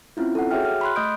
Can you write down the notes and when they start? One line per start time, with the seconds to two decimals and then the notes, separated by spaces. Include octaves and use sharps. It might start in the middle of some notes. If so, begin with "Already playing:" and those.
0.17 C4 C#4 E4 F4
0.35 A4 F#5
0.51 F#4 G#4 C#5 E5 G5 F6
0.65 F6
0.81 B5 C6 F#6
0.96 A3 D#5 D#6 G6 D7